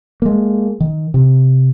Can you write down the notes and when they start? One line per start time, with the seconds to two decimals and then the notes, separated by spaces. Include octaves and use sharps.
0.22 G#3 A#3
0.80 D#3
1.14 C3